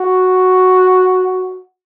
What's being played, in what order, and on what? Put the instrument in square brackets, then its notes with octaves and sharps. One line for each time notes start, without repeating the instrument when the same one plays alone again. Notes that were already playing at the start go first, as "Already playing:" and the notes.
Already playing: [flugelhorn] F#4